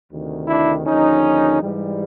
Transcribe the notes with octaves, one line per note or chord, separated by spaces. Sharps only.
D2 C3 D#3
D4 E4
D#2 D3 F3 C#4 D#4
G#2 E3 G3